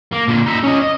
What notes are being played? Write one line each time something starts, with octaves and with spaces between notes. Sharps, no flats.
A#3
A#2 D3
D#4 E5
C#4 D#5
D#5